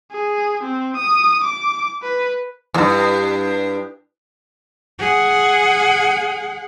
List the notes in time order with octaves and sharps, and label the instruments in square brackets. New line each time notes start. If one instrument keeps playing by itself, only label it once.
[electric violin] G#4
C4
D#6
D6
B4
[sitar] E2 G2
[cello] G#4 F#5